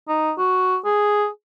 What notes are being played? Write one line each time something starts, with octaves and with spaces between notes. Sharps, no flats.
D#4
F#4
G#4